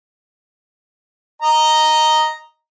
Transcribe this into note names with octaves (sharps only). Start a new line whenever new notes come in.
D#5 A#5